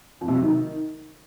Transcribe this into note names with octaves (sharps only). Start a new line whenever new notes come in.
F2
C3
F#3
D#3